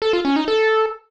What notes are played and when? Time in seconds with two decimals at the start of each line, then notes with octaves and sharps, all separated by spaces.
0.02 A4
0.13 F4
0.25 C#4
0.36 D#4
0.48 A4